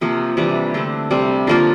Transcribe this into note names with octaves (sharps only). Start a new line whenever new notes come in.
C3 F3 A#3
C3 E3 G3 D4
D3 A3 C4
C3 G3 C4
D3 F3 A#3 F4